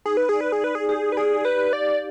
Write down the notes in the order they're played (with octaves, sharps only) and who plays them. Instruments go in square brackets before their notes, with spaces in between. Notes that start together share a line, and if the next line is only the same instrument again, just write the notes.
[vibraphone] D#4 [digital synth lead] G#4
[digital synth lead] B4
[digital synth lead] G#4 [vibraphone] D5
[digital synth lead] B4
G#4
[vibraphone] D#4 [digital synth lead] B4
[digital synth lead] G#4
[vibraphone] G4 [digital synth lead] G#4
[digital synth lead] B4
[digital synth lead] G#4 [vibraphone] D5
[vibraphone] G4 [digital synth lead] B4
[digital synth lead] D5 [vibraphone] F5